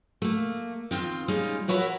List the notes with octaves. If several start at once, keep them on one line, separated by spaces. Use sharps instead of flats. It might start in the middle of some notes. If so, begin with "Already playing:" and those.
A3 A#3
D#3 C4 F4 G5
G3 G#3 C#4 D#4 F4
F#4 A#4 B4 C#5 E5 F#5